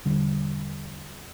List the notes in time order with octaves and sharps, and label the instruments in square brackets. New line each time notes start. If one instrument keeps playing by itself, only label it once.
[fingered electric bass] E1 D3 G3